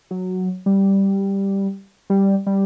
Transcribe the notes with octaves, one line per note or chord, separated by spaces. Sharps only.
F#3
G3
G3
G3